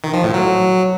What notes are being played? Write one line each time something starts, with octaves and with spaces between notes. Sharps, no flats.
D#3
F3
A2
F#3